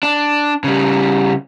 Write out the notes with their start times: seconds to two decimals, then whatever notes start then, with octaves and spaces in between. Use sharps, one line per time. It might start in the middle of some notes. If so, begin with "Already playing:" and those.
0.03 D4
0.64 C#3 G3